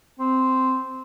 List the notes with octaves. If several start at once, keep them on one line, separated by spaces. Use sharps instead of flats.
C4